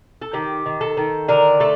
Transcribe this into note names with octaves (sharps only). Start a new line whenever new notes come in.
A4
D#3 G4
D#3
A4
D#3
D3 A#4
A3 A4